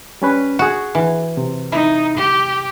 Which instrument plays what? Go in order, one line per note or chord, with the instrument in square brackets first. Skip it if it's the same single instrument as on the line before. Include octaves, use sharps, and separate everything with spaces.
[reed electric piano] G3 C#4 B4
[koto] F#4 [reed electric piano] G#4 F#5
[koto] E3
[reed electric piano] C3
[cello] D#4 [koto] E4
[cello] G4